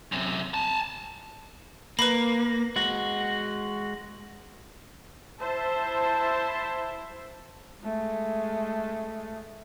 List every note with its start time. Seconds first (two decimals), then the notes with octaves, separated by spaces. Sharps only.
0.12 F#2 C3
0.54 G#5 A5
1.99 A#3 B4 B5
2.76 G#3 F#4
5.39 E4 C5 E5 A5
7.82 G#3 A3